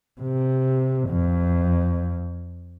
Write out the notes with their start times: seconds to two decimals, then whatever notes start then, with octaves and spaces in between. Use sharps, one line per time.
0.21 C3
1.09 F2